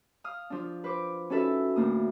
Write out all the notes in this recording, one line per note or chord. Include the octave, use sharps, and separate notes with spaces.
F5 D#6 F6
F3 D4
B4 C5 D6
C#4 D#4 F#4 A4 B4 E5
D2 A2 A#3 D#6